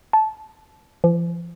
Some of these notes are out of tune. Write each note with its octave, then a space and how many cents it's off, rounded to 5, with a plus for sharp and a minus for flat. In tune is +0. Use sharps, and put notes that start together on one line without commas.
A5 -15
F3 -40